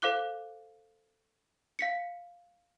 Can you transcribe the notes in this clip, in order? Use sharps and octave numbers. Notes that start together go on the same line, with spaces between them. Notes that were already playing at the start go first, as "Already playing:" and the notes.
A4 C5 F5 D6 F#6 G7
F5 B6 C#7